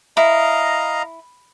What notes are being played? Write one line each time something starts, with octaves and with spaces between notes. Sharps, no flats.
E4 D#5 F5 A#5